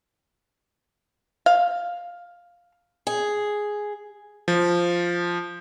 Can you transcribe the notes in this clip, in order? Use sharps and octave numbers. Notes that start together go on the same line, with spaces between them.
F5
G#4
F3